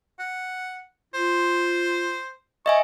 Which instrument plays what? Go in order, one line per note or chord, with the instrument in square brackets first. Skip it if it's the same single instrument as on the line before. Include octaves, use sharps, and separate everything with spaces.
[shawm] F#5
[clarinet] F4 [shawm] C5
[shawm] C#5 [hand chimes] D#5 E5 G#5 [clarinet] C#6